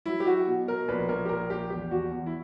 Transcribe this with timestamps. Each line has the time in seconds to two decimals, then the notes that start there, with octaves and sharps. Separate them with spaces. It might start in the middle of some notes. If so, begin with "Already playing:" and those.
0.06 F#3 E4
0.20 G4
0.26 F#3 F#4
0.47 B2
0.68 B2 A#4
0.88 A#1 B4
1.08 A#1 A#4
1.25 G4
1.29 A#1 A#4
1.50 A#1 G4
1.70 E2 G4
1.91 E2 F#4
2.11 E2
2.26 E4